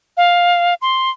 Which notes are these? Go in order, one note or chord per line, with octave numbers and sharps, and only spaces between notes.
F5
C6